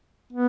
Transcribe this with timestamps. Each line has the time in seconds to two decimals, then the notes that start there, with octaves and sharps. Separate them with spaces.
0.33 B3